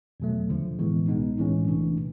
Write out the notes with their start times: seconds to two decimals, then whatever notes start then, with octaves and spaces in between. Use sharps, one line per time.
0.20 E2 B2 F#3 A3
0.49 D#2 D3 F3
0.79 A2 E3 G#3 B3
1.08 C2 B2 G#3 B3 D#4
1.38 A2 E3 G#3 C#4
1.67 C2 C3 E3 A3 D4
1.96 A#2